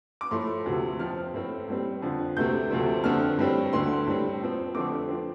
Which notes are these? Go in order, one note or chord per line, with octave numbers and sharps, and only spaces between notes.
D6
A2 F3 A3 C6
D2 C3 F3
F2 F3 C4 F6
A2 A3 C4
A2 G3 C4
F2 D3 F3
D2 C3 A3 C4 G6
D2 C3 F3 A3 C4
F2 D3 A3 C4 F6
A2 G3 C4
D2 D3 A3 C4 C6
A2 G3 C4
F2 F3 C4
F2 D3 A3 C4 D6
F3 C4